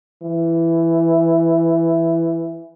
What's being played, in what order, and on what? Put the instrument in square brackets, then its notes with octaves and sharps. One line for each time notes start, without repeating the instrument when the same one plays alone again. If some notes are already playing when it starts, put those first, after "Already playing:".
[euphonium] E3